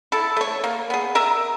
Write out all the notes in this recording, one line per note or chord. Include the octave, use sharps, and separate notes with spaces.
E4 A4
A3 C#5
A#3
B3 G#4
A#4 E5 A#5